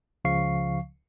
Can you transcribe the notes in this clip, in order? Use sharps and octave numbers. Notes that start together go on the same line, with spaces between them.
C#2 C#3 F3 F5 C#6 C7